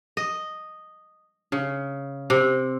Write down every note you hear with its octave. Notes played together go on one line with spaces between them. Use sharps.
D#5
C#3
C3